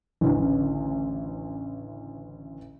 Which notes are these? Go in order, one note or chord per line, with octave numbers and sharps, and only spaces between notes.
A1 D2 C#3